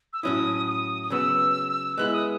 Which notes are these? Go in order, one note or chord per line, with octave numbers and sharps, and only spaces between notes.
E6
A2 F#3 C#4 E4 D#6
D#6
D#6
C#3 F#3 B3 E6
G#3 B3 E4 F#6
E6
D#6